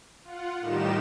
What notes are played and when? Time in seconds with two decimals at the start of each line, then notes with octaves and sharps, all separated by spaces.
0.23 F4 F#5
0.59 A2 D#3 G3 D#4 G4 E7